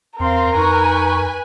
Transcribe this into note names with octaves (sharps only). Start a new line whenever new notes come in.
E2 C4 A#4 F5 C6
F2 D#4 B4 G#5 C#6